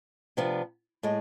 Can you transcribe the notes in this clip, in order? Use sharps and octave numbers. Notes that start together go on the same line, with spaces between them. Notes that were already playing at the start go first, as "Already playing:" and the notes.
C3 F3 B3 D4
A2 G#3